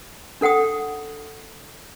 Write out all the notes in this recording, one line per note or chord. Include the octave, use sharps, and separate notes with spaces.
D4 A4 F#5 G5 D#6